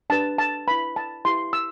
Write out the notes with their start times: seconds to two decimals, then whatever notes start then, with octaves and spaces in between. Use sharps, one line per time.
0.10 D4 G4 B4 A5
0.38 A5
0.67 E4 B4 B5
0.96 A5
1.25 E4 G4 B4 C6
1.53 E6